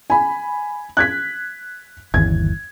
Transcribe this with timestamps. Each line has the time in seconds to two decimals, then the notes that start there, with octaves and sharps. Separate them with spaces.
0.10 G#5 B5
0.97 F#6 G#6 B6
2.14 G1 D#2 E3 G#6